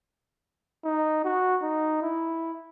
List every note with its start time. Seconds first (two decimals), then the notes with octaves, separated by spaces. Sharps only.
0.84 D#4
1.25 F#4
1.62 D#4
2.02 E4